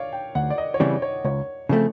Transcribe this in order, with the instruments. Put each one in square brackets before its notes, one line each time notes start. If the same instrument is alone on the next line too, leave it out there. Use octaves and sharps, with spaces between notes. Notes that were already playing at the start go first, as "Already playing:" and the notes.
Already playing: [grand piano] C#5 D5 F5
G5
[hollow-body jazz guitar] D2 [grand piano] F#5
[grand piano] D5
D#5
C#5
[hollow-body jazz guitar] C#3 E3 G3 C4 [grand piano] D5
[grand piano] C#5
[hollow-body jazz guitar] C#2 [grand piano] C#5
[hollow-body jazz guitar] C#3 F3 A3 C4